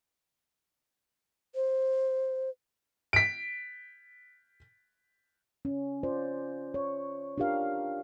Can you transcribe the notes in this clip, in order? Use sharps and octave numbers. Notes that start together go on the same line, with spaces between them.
C5
B6 D7
C#4
F4 C5 D5
C#5
D4 F4 G4 A#4 F5